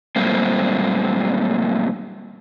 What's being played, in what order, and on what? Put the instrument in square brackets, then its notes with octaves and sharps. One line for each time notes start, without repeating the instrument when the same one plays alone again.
[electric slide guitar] F#2 A#2 G3 A3 A#3 C4